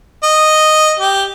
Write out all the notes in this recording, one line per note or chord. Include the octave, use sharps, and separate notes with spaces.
D#5
G4